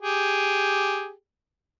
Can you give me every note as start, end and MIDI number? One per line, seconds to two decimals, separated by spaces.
0.02 1.11 67
0.02 1.11 68